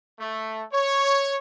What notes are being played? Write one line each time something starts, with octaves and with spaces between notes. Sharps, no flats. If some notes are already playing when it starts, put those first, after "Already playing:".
A3
C#5